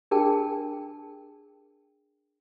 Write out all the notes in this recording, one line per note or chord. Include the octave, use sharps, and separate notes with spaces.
D4 G#4 A#4 G5 A5